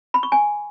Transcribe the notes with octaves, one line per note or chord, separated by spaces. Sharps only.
B5
C#6
G#5